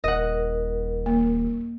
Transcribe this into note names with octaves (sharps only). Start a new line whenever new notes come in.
D#1 A#4 D#5 F#5
A#3